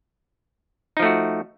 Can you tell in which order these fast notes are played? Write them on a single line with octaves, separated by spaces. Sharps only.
D#4 F3 A3 F#4